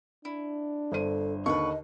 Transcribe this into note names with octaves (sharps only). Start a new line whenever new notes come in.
D4 E4
G1 A4 C5 D#7
D#2 D3 B4 D#5 F#5 C#6